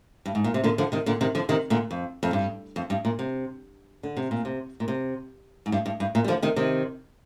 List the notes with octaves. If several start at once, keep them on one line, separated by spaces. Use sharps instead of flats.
G2
G#2
A#2
C3
A#2 D3
D3 F3
C3 D#3
A#2 D3
C3 D#3
D3 F3
C3 D#3
A#2 D3
F2
F2
G2
F2
G2
A#2
C3
D3
C3
A#2
C3
A#2
C3
G#2
G2
G2
G2
A#2
G3
D3 F3
C3 D#3
C3 D#3